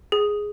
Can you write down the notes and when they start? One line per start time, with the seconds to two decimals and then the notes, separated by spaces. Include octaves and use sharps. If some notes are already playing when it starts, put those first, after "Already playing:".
0.12 G#4